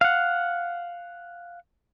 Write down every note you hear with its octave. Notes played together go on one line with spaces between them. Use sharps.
F5 F#5